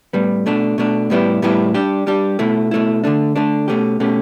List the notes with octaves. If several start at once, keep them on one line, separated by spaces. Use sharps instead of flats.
A2 G3 B3
B2 A3 D4
B2 A3 D4
A2 G3 B3 E4 G4
A2 G3 B3 E4 G4
G3 D4 G4
G3 D4 G4
B2 A3 E4
B2 A3 E4
D3 A3 D4
D3 A3 D4
B2 A3 C#4 G4
B2 A3 C#4 G4